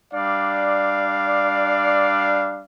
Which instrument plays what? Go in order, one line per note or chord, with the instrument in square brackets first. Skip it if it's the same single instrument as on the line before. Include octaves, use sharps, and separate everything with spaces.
[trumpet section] G3 D4 D5 F5